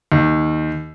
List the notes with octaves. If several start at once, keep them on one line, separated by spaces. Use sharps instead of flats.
D#2